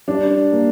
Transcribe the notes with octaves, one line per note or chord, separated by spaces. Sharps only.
G3 D4
A#3